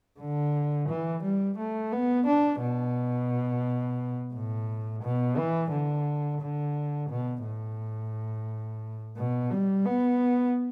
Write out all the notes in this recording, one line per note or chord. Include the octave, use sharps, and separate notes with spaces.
D3
E3
G3
A3
B3
D4
B2
A2
B2
E3
D3
D3
B2
A2
B2
G3
B3